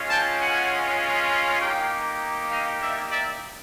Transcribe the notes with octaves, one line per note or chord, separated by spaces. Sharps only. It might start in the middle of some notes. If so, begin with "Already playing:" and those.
Already playing: G#3 C#4 F4
G5 A5
F#5 G#5
A#3 D#4 G4 F5 G5
D#5 F5
D5 E5
D5 E5